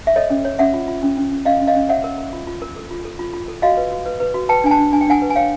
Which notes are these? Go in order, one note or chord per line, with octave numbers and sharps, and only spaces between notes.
E5
A4 C#5 D#5
C#4
C#5
C#4 E5 F#5
F4
F4
C#4
C#4
C#4
C#4 D#5 F5
C#4
D#5 F5
C#4
C#5 E5 F#5
A#4
A#4
F4
F4
A#4
A4
F4
A4
F4
F4
A4
F#4 D#5 F5
B4
F#4
B4
B4
F#4
B4 G5 A5
D4 G#5
G5 A5
D4
D4 G#5
G5
D4 F#5 G#5
B4
G#5
C#5 F5 G5